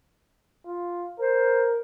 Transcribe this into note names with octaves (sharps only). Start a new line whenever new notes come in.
F4
A#4 C5